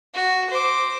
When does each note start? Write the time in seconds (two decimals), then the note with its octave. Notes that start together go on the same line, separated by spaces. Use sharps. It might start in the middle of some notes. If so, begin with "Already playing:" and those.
0.14 F#4
0.49 C5 D6